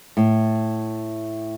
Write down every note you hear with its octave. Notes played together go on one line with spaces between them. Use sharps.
A2